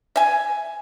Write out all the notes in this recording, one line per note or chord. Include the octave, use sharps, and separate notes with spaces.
E5 G#5